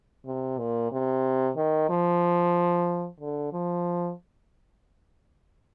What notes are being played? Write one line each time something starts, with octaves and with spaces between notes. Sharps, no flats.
C3
A#2
C3
D#3
F3
D3
F3